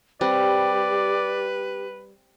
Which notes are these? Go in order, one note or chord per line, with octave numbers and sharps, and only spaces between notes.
G3 C4 G4 B4 D5